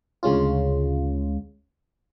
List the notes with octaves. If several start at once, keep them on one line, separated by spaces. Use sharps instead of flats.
D2 C#3 G#3 C#4 F4